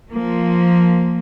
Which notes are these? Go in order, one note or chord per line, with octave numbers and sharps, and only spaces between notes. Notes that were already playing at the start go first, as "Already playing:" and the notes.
F3 A#3